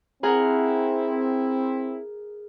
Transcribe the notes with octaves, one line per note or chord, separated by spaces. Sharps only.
C4 E4 G#4 A#4 F#5